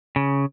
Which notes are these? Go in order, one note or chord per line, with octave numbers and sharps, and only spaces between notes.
C#3